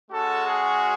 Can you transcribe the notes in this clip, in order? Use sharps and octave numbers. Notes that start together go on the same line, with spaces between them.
G#3 C#4 F#4 A4
G#4